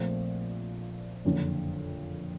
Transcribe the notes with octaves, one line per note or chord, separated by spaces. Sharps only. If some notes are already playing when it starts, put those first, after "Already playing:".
Already playing: A#1 A#2 F3 A3 C4
F#1 F2 D3